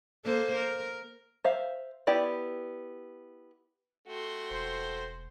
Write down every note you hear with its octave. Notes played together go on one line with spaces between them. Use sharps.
A#3 A4 C5
A#4
C5 E5 F5
B3 E4 G4 D5
A3 F#4 G5 C6
E1 C5